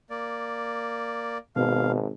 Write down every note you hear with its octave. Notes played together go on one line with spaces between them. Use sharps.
A#3 D5
G#1 B2 F5